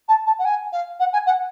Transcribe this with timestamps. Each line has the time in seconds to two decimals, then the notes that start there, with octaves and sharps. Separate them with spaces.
0.08 A5
0.26 A5
0.39 F#5
0.45 G#5
0.72 F5
1.00 F#5
1.13 G#5
1.26 F#5